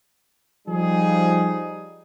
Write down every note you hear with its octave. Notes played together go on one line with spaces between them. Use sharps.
F3 G3 D#4 G#4